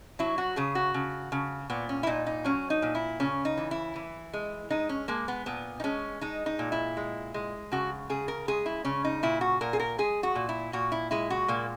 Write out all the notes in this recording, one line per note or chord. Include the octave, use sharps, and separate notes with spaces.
F#3 E4
F#4
C#3 G#4
F#4
C#3
C#3
A#2 B3
C#4
E4
A#2 D#4
D#4
F#3 C#4
D#4
A#2
E4
C#3 C#4
D#4
E3
E4
E3
G#3
G#3 D#4
C#4
G#3 A#3
B3
A#2 B3
D#4
G#3 C#4
G#3 D#4
D#4
A#2
E4
G#3
G#3
C#3 F#4
C#3 G#4
A#4
G#3 G#4
E4
C#3 C#4
D#4
A#2 E4
F#4
A#2 A#4
G#4
A#4
G#3 G#4
F#4
A#2
E4
A#2 F#4
E4
G#3 E4
F#4
A#2 A#3